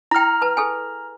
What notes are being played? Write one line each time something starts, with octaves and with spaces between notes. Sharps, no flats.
E4 G5 A#5 F6
B4 A5
G#4 A4 G#5